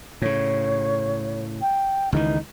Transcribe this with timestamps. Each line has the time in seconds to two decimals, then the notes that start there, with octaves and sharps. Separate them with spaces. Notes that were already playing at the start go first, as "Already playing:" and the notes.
0.22 A2 C#3 C#5
1.61 G5
2.12 C#2 D#3 E3 D#4